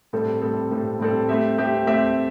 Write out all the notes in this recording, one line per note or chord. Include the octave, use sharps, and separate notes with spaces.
A2 G3 C4 A4
A2 G3 C4 A4
A2 G3 C4 A4
A2 G3 C4 A4
A3 C4 G4 E5
A3 C4 G4 E5
A3 C4 G4 E5